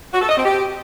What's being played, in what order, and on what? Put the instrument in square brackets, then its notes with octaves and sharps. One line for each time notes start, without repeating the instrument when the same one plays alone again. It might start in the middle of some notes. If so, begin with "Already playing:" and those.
[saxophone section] F#4
A4
D#5
C4
G4